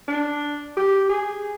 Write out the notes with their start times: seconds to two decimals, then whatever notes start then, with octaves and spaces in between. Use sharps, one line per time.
0.08 D4
0.77 G4
1.09 G#4